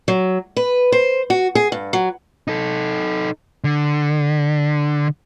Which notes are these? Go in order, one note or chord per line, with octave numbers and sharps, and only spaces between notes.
F#3
B4
C5
F#4
G#4
G2
F#3
D#4 A4
D3